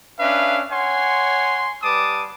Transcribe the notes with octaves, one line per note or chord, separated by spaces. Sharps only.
C#4 D4 B4 E5 F5
C#5 F#5 G#5 C6
G3 B4 A5 D6 D#6